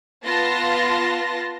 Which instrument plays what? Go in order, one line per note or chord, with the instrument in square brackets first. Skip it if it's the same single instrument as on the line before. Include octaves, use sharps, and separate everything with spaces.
[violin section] B3 F4 A5 C6 A#6